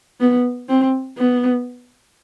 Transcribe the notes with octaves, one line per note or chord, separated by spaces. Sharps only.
B3
C4
B3